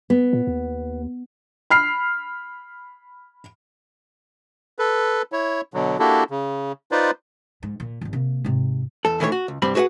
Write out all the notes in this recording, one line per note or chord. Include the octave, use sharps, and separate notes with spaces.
B3
A#2
D#2
B5 F6 C7
A4 B4
E4 C#5
B2 D3 F#3
A#3 D4 E4 F#4 G4 A4
C#3
D#4 F4 B4 C5 D5
G#2
A#2
G#1 G2
C3 A#3
G#2 C3
E2 A4
D#3 E3 A3 B4 C#5
F#4
C#2
C2 G2 G3 C4 B5
F#4 G#4 B4 E5 F#5